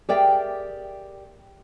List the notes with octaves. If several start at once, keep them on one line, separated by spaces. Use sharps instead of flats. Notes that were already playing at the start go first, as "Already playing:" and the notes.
G4 G#4 A#4 D5 E5 G5